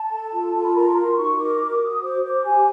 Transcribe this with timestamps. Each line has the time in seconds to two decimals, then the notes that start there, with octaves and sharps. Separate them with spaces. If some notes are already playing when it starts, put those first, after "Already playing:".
Already playing: A5
0.11 A4
0.32 F4
0.53 F4
0.64 B5
0.74 A#4 A#5
0.95 F#4 C6
1.16 D#4 C#6
1.38 A#4 D6
1.54 F#4 D6
1.70 D6
1.81 F#4 D#6
2.02 C5 D6
2.22 C5 D6
2.44 G4 G#5